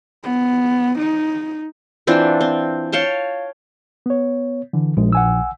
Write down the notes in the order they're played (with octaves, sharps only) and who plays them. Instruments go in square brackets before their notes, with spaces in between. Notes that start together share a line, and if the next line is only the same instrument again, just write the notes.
[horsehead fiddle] B3
D#4
[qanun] E3 C4 D4 F4
C4
C#5 F5 G5 A5
[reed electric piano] B3 C#5
D3 E3
[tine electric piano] A#1 [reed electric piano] G#3
[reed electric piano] F#5 G#5 E6